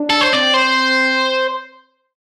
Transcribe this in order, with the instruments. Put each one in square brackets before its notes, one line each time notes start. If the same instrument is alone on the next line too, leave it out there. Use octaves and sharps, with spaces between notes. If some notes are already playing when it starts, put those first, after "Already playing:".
Already playing: [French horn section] D4
[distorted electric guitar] A4
C5
[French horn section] C4 [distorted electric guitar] D5
[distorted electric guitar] C5